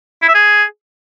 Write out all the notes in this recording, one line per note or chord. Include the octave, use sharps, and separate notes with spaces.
E4
E5
G#4